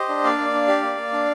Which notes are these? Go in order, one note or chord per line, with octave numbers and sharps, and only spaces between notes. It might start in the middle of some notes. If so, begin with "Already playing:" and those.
Already playing: G4 C5 D#5
D4
A#3 D5 F5
A#3
D4
G4
A#3
A#3
D4